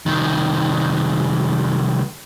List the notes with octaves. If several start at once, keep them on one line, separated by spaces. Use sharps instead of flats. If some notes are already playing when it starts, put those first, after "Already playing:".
C2 D#3